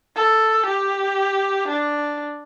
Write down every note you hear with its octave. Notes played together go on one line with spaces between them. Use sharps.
A4
G4
D4